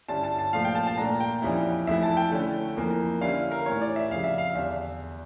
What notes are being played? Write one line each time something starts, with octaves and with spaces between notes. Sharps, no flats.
G2 D3 G3 C#4 E4 A5
A5
A5
A#2 F3 A3 F5
G5
A5
A5
A#2 A3 D4 A#5
G5
F2 E3 G3 C#4 E4
F2 E3 A3 E4 E5
A5
G5
D3 A3 C#4 E4
F2 E3 A#3
D3 G3 C#4 E4 F5
A#4
A2 E3 G3 C#5
D5
E5
F2 C#3 G3 F5
E5
F5
E2 D3 G3 D4 E5